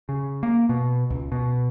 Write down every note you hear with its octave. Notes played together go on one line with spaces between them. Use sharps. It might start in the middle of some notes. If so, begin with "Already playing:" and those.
C#3
A#3
B2
C#2
B2